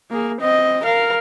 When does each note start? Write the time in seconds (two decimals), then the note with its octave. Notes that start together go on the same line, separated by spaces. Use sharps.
0.10 A#3 G#4
0.41 C4 D#5
0.83 A#4 F5